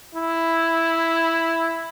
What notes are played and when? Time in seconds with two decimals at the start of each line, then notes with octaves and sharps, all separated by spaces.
0.15 E4